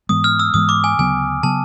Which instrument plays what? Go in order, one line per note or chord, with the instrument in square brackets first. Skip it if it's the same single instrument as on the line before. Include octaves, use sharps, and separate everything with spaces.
[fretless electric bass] G#2 E3 G#3 B3 [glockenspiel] D#6
[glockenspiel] F6
E6
[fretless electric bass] G#2 E3 G#3 B3 [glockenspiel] D#6
[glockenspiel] D6
G#5
[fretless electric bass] D2 C#3 F#3 B3 [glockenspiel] G#5
[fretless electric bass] C#3 F#3 B3 [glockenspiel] A5